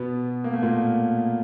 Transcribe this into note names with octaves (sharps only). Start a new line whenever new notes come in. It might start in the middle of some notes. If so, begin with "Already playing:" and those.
Already playing: B2 B3
A#3
A3
A#2 A#3